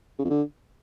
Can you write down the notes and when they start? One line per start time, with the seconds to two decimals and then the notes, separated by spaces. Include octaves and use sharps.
0.19 C#3
0.25 F2
0.30 D3